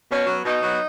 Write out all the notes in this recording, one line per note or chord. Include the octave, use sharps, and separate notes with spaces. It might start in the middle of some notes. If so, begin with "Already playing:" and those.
B2 C#4
F#3 B3
B2 D#4
F#3 B3